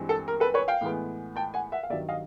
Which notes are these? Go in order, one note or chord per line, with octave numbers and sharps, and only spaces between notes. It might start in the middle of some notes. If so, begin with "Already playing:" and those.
Already playing: G2 E3 G#3 C4
A4
A#4
A4 B4
B4 C#5
F5 G5
A2 E3 G#3 B3
G5 A5
F#5 G#5
E5 F#5
F5
G2 D#3 F#3 D5 E5
D#5 F5